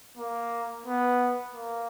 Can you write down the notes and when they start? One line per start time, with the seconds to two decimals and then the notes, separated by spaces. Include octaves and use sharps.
0.17 A#3
0.86 B3
1.54 A#3